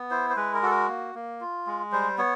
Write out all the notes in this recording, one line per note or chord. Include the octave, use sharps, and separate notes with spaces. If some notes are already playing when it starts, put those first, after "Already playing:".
Already playing: B3
E4 C5
C5
G#3 B4
A#4
F#4 A4
A#4
A#3
A#3
F4
G#3
G3 C5
B3 C#5